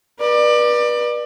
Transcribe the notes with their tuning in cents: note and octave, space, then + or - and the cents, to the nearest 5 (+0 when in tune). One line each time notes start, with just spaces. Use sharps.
B4 -35 D5 +25